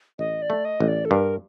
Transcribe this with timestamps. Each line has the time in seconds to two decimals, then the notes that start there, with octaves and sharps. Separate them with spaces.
0.19 A1 D#5
0.42 D5
0.50 A3
0.65 D#5
0.80 A1
0.88 D5
1.05 A4
1.11 G2 A#4